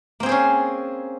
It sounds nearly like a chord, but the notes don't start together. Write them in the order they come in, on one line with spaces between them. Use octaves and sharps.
A#3 C4 G#4 C5 C#4